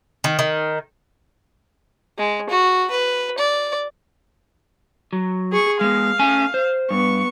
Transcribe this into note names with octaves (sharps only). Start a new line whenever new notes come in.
D#3
D#3
G#3
F#4
B4
D5
F#3
G#4 C#6
G#3 B3 F5
A3 C#4 G#5
C5
G2 B3 C#6